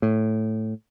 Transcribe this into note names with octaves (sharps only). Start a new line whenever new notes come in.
A2